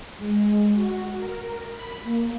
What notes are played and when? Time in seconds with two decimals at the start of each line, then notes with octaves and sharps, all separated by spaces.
0.18 G#3
0.72 F#4
1.17 A#4
1.71 B5
2.03 A#3